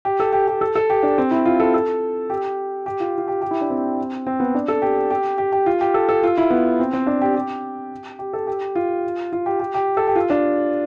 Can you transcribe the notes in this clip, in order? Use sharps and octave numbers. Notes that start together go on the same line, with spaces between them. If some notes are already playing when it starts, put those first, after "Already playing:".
G4
A4
G4
G4
A4
A4
G4
D4
C4
E4
F4
A4
A4
G4
G4
F4
F4
G4
G4
E4
D4
C4
C4
B3
D4
A4
G4
G4
G4
G4
F4
G4
A4
A4
F4
E4
B3
C4
C4
D4
G4
G4
G4
A4
G4
F4
F4
G4
G4
G4
A4
G4
F4
D4